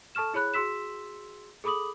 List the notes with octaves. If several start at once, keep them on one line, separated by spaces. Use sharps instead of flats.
A4 A5 C#6 F6 E7
E4 G#4 C#5 B5 F#6
F#4 G#4 C6 E6 B6 E7
G#4 A4 B5 D6 D#6 F#7